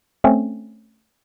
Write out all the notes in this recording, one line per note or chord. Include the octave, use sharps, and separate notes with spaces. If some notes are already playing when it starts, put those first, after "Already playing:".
A3 C4 C#4